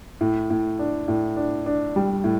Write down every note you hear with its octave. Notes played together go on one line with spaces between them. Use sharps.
A2
A2
D4
A2
D4
D4
G3
A2